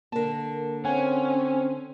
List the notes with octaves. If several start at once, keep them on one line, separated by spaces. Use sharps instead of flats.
D3 A#3 A#4 A5
C4 C#4 F#5 G#5